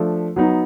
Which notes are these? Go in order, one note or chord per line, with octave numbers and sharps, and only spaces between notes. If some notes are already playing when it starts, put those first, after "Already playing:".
Already playing: F3 A3 D4
F#3 B3 D#4